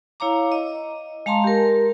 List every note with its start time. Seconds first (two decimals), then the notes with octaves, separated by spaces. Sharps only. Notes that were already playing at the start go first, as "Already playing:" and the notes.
0.20 E4 C#5 F5 A#5 D6
0.52 D#5
1.26 G#3 F5 A5 A#5 C6
1.44 G4 A#4